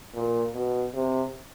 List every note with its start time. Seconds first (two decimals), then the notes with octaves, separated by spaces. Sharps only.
0.14 A#2
0.54 B2
0.94 C3